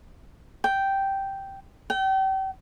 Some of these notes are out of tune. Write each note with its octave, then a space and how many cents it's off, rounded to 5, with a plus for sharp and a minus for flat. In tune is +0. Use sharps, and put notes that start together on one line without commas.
G5 -5
G5 -35